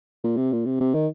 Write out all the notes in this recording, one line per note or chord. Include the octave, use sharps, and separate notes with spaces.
A#2
C3
A#2
C3
C3
D#3